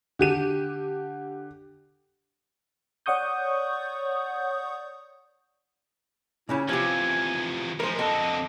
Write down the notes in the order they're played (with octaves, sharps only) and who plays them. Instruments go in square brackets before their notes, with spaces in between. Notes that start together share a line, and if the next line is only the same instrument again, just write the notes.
[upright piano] D3 G4 D#7
[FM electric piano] C#5 D5 F#5 C#6 D#6 G6
[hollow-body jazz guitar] A#2 C#3 C#4 [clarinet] E4
[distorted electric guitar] E2 F3 [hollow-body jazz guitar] C3 F4 G4 [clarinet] G#5
[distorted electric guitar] A2 G#3 [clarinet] F3 [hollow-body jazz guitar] A#4 C5
[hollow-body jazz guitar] F2 A4 [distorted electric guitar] D3 C4 [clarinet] D#5